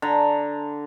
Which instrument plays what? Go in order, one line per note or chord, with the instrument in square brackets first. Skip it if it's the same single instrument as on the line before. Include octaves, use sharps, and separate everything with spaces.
[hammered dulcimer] D3 A#5